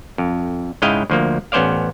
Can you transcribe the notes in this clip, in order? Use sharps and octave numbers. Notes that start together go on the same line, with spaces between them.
F2
G#2 C#3 E4 D#5 F5 G5
D2 F3 A#3
A1 B3 C#4 C5 D5 F5